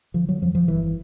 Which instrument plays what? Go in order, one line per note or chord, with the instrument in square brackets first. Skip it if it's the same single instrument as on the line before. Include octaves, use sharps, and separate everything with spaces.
[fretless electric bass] D3 F3
F#3
F2 F3
F3
G1 E3